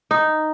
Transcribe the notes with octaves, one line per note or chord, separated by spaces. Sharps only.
D#4